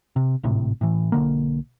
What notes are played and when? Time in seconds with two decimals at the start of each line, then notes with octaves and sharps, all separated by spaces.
0.16 C3
0.43 G#1 A2 C3
0.81 A2 E3
1.12 B1 D3 A#3